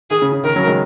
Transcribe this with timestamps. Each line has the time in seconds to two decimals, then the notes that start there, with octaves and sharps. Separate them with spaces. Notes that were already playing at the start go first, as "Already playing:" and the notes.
0.11 D#3 G#4
0.22 C#3
0.32 C#3
0.44 D#3 A#4
0.56 C#3 F#3
0.66 D#3 G#3